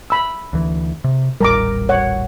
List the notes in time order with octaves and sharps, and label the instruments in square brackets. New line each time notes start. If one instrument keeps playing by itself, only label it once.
[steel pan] B5 E6
[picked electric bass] D2 E3
C3
[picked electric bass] D#1 A1 G3 [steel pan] A#4 A#5 D6
[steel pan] C#5 F#5